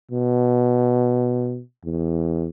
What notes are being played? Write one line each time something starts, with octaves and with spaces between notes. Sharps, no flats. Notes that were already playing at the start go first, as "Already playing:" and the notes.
B2
E2